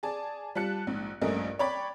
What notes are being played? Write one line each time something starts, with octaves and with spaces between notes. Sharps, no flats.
G#4 D5 A5
G3 F4 A5 F#6 C#7
A#1 G#2
A#1 G2 A3 C#4 A#4 D#5
C#5 D5 G5 B5 D6 A6